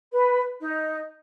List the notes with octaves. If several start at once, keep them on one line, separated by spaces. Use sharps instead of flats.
B4
D#4